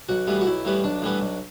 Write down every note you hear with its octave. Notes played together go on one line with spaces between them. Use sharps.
B1 F#4
A2 E3 G3 B3
F#4
B1 E4
A2 E3 G3 B3
B1 D4
A2 E3 G3 B3
B1